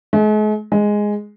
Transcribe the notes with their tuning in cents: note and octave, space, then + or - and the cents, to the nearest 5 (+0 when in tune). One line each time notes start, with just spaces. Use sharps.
G#3 +45
G#3 +0